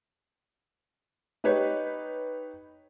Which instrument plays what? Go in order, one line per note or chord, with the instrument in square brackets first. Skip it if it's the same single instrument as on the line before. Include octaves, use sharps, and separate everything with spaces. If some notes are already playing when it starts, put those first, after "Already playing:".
[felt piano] D#4 G4 B4 C#5